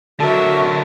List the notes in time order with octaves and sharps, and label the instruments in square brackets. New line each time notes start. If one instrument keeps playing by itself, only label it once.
[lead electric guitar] D3 F#3 [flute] F#4 [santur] A4 D#5 E6 [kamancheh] A#4 E5